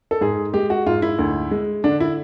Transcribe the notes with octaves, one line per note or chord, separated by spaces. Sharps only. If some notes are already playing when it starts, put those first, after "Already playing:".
A4
G#2 G#4
G#3 G4
F#4
G#2 F4
E4
D2
G#3
D3 D4
E4